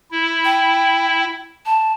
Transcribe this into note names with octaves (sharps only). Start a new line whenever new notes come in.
E4
G5
A5